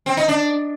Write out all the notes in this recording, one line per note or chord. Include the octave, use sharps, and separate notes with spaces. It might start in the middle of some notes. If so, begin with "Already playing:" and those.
C4
D#4
D4